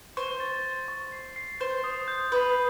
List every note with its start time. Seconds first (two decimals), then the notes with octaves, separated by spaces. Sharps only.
0.17 C5 C#6
0.40 A6
0.65 A6
0.88 C#6
1.12 C7
1.36 C7
1.60 C5 G6
1.84 D#6
2.08 G6
2.32 B4 D#6